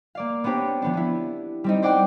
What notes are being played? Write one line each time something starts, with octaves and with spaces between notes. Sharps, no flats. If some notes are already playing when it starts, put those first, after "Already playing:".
A#3 D5 F5
B3 C4 D4 G4 C#5
F3 B3 D4
B3 E4
G3 C4 D#4
C5 D5 F#5 G5 C6 D6